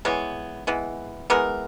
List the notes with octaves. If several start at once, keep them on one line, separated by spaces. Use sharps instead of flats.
E3 G#3 B3 C#5
E3 G#3 B3
E3 G#3 B3 A#4